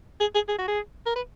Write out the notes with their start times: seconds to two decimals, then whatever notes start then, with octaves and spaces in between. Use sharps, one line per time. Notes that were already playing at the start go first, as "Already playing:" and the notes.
0.20 G#4
0.35 G#4
0.48 G#4
0.58 F#4
0.68 G#4
1.06 A#4
1.16 B4